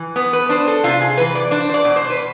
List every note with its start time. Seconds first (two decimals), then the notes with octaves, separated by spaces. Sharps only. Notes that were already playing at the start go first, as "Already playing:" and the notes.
Already playing: E3
0.16 B3 B4
0.33 B4
0.49 D4 C5
0.67 A4
0.84 C3 F4
1.01 G#4
1.17 E3 B4
1.35 D5
1.51 D4 C5
1.69 C5
1.74 D5
1.85 B2
1.96 C5
2.10 B4